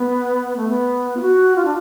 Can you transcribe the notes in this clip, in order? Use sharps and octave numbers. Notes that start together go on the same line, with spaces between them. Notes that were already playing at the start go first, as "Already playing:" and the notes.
Already playing: B3
A3
B3
F4
F#4
F4
D4